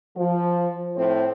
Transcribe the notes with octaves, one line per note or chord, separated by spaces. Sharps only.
F3
A2 C4 C5